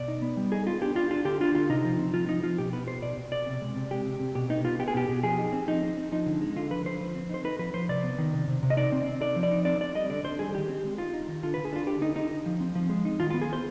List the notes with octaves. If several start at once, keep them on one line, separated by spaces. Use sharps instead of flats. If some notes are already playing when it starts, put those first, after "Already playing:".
Already playing: B2 D5
D#4
B3
G3
D#4 G#4
B3 F4
D4 G4
D4 F4
D4 F4
D3 G4
D4 F4
D3 F4
C3 D#4
F3
C4
F3 F4
F3 D#4
F3 F4
B2 G4
B3 B4
B3 C5
B2 D5
B2
B2 D5
C3
G#3
C3
G#3 G4
C3
C3
B2 G4
B3 D#4
B3 F4
B3 G4
G#4
B2 G4
B2
F3 G#4
D#4
C4
F3 D#4
C4
C4
F3 D#4
D3
G#3
D3 F4
F3 B4
D3 C5
F3
C4
D#4 C5
D#4 B4
F3 B4
F3 C5
C3 D5
B3
D#3
C3
C3
C3
D#5
D#4 D5
C4
C4
D#4 D5
F3
D5
D#4
C4 D5
C4 D5
G3 D#5
D3 D5
D3 C5
G3 G#4
D#3 G4
C4
G#3
D#4 F4
D#4
D#3
D3 F4
D3 B4
G#4
D4 F4
D3 G4
D3 D#4
D3 D#4
D#4
F3
C4
F3
G#3
D#4
D#3 F4
B3 F4
G#4
B3 C5